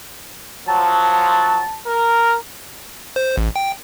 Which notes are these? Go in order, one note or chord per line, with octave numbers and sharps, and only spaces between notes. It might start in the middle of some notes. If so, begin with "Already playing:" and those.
F3 F#3 A5
A#4
C5
A1
G5